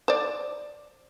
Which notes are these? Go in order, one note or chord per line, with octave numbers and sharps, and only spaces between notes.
C5 D5